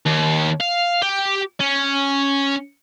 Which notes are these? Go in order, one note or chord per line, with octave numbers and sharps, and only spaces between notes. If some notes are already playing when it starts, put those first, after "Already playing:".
D#2
F5
G4
C#4